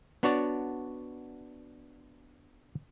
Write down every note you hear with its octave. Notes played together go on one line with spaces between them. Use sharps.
B3 D4 F#4 C#5 D5 A5